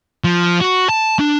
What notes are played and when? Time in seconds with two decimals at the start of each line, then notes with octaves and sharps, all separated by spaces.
0.24 F3
0.61 F#4
0.89 A5
1.19 D4